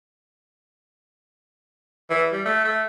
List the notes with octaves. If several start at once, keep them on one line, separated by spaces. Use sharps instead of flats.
E3
G3
A3
A3